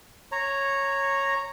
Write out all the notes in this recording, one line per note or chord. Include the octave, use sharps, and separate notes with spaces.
C#5 A#5